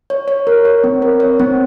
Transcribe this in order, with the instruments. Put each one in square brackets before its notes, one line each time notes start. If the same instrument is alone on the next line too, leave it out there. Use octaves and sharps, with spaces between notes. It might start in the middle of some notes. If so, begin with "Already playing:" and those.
[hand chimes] C#5
C#5
A#4
C#5
C4
A#4
C#5
C4